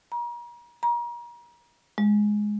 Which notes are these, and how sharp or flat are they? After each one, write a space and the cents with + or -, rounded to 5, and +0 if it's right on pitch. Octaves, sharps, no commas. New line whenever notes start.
A#5 +40
A#5 +35
G#3 +5